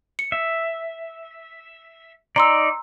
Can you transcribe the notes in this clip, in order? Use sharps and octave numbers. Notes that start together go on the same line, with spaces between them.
C#7
E5
D#4 D5 A#5 C6 E6